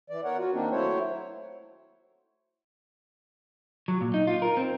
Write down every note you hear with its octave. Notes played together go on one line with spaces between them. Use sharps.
E3 D5
B3 A#4 C#5 F#5
F4 F#4
D#3 A#3 C4 D4 D#4
F#3 A3 E4 C5 C#5
F#3
A#2
D#4
F4
A#4
C4